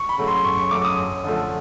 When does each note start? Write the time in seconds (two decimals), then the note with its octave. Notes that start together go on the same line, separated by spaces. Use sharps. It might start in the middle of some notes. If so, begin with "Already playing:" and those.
Already playing: C#6
0.09 B5
0.18 C#3 F#3 A3
0.28 C6
0.44 F#2 C#6
0.58 C#6
0.71 C#3 F#3 A3 D6
0.85 D#6
0.98 F#2
1.24 D3 F3 A3